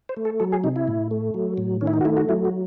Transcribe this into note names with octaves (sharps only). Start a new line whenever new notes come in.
C5
A3
A4
F#3 A4
G#4
C3 D#4
E4
A2
A3
F#3
A2
D#3 C#4
E4
D#4
F#4
A3 E4
F#4
F#3 E4
F#4